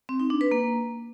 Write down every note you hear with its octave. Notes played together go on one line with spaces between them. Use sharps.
C4
D#4
D4
B4
A#3